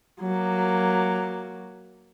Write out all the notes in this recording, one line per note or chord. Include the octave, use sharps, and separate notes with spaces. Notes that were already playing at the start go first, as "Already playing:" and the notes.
F#3 A#3